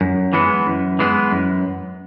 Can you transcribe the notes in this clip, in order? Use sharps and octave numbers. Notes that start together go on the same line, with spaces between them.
F#2
E3 G#3 B3
F#2
E3 G#3 B3
F#2